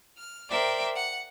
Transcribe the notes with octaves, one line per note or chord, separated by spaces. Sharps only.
F6
A#4 C5 D5 E5 G5
F#5